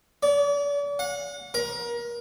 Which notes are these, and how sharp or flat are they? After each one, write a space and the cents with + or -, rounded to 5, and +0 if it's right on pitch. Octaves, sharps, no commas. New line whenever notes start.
D5 -45
F#5 -35
A#4 +30